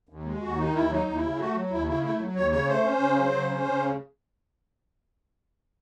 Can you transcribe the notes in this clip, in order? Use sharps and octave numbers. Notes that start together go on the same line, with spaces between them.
D#2
G#3
D#2 F#4
D#3 D#4
D#2 E4
F#3 D#4
D#2
E4
C#3
A3 F#4
F#3
D#2 E4
C#3 E4
A3 E4
F#3
D#2 C#5
C#3 C#5
A3 C5
C#4
C#3
F#3
C#3
C#4
C#3